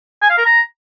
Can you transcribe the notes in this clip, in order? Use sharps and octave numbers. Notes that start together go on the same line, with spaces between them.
G#5
F5
A#4
A#5